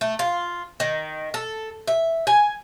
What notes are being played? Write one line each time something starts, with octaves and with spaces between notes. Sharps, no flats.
A3
F4
D#3
A4
E5
G#5